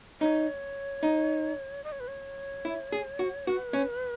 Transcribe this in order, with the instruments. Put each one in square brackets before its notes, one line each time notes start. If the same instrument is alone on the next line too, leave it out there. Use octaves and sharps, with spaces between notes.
[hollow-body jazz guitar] D#4 [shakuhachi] C#5
[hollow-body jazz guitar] D#4
[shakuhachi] D#5
C#5
B4
C#5
[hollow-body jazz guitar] E4
G#4
F#4
[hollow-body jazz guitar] F#4 [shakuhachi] B4
[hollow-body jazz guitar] C#4